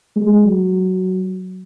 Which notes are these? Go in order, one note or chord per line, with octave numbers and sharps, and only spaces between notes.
G#3
F#3